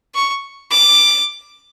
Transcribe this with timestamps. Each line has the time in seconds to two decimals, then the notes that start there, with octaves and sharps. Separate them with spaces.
0.15 C#6
0.71 D6